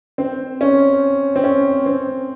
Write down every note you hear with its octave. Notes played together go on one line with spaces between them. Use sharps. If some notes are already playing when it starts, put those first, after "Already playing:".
C4 C5
C#4
C4
C#4
C4